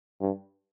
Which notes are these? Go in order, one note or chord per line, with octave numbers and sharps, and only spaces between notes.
G2